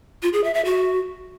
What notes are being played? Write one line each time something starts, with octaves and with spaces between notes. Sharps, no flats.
F4
G#4
E5
E5
F#4